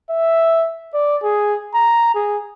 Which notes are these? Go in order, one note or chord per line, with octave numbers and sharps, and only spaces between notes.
E5
D5
G#4
A#5
G#4